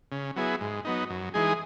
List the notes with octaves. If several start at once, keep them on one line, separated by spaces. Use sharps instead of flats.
C#3
F#3 B3 E4 G#4
G#2
F#3 B3 D#4
F#2
E3 G#3 D#4 G#4